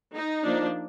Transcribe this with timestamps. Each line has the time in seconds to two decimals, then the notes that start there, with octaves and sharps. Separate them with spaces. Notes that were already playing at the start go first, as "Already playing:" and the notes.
0.15 D#4
0.44 F3 A#3 D4